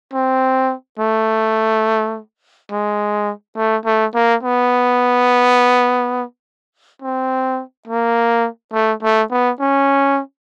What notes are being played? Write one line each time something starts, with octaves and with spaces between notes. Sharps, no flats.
C4
A3
G#3
A3
A3
A#3
B3
C4
A#3
A3
A3
B3
C#4